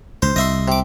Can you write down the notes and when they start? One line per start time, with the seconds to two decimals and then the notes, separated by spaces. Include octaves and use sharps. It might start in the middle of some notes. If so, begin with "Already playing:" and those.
0.22 C#2 C5
0.36 C2 D#5 E5 C6
0.68 C3 D6